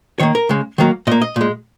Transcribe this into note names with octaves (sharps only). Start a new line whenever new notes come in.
D#3 A#3 C#5
A#4
C#3 G#3
D#3 F#3 A#3
A#2 A#3 D#5
D#5
A#2 G#3